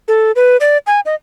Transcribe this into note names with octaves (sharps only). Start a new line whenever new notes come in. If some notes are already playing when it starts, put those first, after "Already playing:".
A4
B4
D5
G#5
D#5